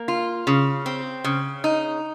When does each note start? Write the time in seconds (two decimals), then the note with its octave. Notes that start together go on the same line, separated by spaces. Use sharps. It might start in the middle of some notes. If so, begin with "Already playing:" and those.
Already playing: A#3
0.08 F4
0.47 C#3
0.86 C4
1.24 C#3
1.64 D#4